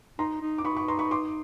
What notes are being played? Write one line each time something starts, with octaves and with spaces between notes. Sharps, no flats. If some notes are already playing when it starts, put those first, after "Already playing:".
D#4 A#5 C6
D#4
D6
D#4 B5 C#6
B5 C#6
A#5 C6
B5 C#6
C6 D6